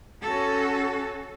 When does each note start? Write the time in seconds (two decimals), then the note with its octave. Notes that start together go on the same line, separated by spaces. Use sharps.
0.23 C#4 F#4 A4